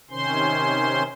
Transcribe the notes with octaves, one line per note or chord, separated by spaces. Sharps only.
C3 D#3 C#4 C5 C6